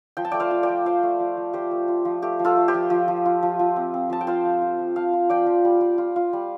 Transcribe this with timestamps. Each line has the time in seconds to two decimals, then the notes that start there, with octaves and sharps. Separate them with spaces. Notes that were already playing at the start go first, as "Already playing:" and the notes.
0.17 F3 G5
0.25 A5
0.31 A3 D5 G5
0.40 C5 F5
0.51 F4
0.63 D5 G5
0.69 F3
0.85 F4 C5 F5
1.03 A3
1.20 F3
1.37 F3
1.53 F4 G4 C5
1.71 A3
1.88 F4
2.05 F3
2.22 A3 G4
2.39 F3
2.45 F4 A4
2.57 A3
2.68 G4 C5
2.74 F3
2.90 F3
3.08 F3
3.26 F4
3.43 F3
3.59 F3
3.76 C4
3.94 C4
4.10 F3 A5
4.21 G5
4.27 F4 C5 F5
4.45 F3
4.62 F4
4.79 F3
4.96 F4 F5 A5
5.13 F4
5.30 F3 D5 G5
5.46 F3
5.65 G3
5.81 F4
5.98 F4
6.16 F4
6.33 G3